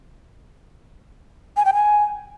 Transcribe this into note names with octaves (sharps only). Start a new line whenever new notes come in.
G#5
G5
G#5